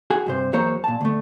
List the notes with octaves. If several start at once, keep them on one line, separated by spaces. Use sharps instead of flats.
F#4 G#4 G#5
G2 C3 C5
E2 F#3 A#3 C5 C#5 A#5
A#2 A5
D2 A3